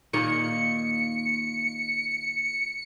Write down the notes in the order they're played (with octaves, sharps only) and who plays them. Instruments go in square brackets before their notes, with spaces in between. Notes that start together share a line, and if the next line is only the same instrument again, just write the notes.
[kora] A#2 D#3 A#3 [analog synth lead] C#7